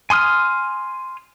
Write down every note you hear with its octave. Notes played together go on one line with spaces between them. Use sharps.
G#5 C6 D#6 F6